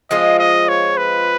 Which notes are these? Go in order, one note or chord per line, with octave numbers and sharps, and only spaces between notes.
F3 G#3 C4 F4 D#5
D#5
C#5
B4